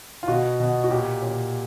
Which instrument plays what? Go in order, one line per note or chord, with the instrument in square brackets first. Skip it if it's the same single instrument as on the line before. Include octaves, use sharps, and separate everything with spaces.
[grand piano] F4
B2 F#4
B2
F#4
A#2 G4
A#2